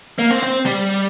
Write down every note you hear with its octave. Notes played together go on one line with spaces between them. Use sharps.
A#3
C4
C4
G3